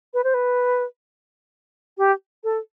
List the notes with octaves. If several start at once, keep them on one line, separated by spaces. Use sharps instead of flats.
B4
C5
B4
G4
A4